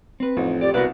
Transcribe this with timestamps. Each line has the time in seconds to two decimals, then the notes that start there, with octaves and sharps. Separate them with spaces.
0.20 C4 B4
0.37 A1 F2 D#4
0.61 G4 D5
0.74 C2 B2 F#4 A#4 B4 D5